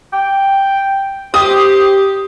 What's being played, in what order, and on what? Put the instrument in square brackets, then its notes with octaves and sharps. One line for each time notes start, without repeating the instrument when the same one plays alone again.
[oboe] G5
[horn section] G4 [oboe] C5 [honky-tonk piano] D#6